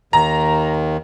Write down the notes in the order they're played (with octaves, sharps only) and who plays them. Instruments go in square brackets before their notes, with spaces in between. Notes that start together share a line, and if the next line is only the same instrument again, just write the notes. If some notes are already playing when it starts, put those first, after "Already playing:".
[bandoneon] D#2 D#3 [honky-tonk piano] A#5